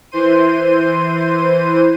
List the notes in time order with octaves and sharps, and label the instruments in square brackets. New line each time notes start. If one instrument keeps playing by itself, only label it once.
[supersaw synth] E3 C5 C6 D#7